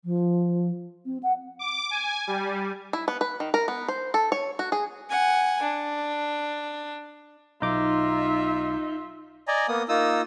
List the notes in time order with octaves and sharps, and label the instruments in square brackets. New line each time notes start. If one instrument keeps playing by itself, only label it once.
[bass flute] F3
C4
F#5
[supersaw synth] D6
G#5
G3
[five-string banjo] E4
B3
B4
D#3
A#4
B3
C5
A4
C#5
F#4
G#4
[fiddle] F#5 G#5
D4
[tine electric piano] B1 D6 [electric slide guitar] D#4 [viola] F4 E5
[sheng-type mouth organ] D5 D#5 G#5 A#5
A#3 B3 D#6
A#3 D#4 F4 D#6 E6